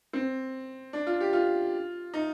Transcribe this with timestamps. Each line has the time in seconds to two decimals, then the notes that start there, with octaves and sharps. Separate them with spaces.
0.13 C4
0.93 D4
1.07 F4
1.21 G4
1.33 F4
2.14 D#4